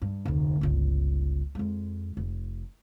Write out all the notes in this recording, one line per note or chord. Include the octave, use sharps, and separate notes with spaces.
G2
F1 D2
G1 C#2
F2 G#3
F1